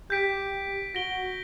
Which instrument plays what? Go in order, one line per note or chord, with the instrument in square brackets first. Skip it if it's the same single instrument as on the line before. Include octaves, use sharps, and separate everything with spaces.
[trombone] G4 [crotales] G6 B6 D7
[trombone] F#4 [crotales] A#6 D7 G7